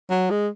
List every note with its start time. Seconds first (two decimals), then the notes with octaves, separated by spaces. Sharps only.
0.10 F#3
0.30 G#3